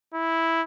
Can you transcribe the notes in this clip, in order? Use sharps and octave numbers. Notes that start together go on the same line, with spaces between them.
E4